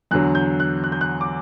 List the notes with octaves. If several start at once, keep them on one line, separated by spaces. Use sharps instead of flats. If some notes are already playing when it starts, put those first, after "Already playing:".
E2 D3 F#3 F#6
G6
F#6
F#6
G6
F#6
D6